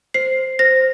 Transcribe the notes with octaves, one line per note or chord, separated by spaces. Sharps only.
C5 C7
C5 A#6